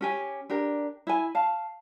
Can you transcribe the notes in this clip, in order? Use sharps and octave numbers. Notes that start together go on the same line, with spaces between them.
C#4 G4 G#5
D4 G4 A#4
E4 G#5
F5 A5